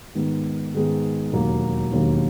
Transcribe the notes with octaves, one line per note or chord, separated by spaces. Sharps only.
G#2 D#3 G#3 B3
G#2 D#3 G#3 B3
E1 D#2 D#3 F#3 A#3
E1 D#2 D#3 F#3 A#3